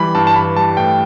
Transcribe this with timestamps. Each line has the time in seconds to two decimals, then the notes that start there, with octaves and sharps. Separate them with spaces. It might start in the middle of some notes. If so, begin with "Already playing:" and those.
Already playing: E3 G3 B5
0.15 G2 A5
0.27 A5
0.36 E3 B5
0.56 G3 A5
0.77 A2 G5